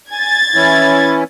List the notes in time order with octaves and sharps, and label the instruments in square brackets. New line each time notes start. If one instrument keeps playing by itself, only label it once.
[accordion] G#5 [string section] G#6 A6
[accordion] E3 C#4 E4